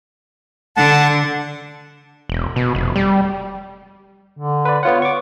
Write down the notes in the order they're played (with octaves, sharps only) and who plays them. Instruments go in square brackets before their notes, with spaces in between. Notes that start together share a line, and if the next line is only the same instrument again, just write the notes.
[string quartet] D3 [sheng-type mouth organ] F#5 A5
[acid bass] E1
B2
F1
G3
[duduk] D3
[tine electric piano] B4 D5
[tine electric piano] B3 F4 F#5 [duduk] C#5
[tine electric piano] C#6 D6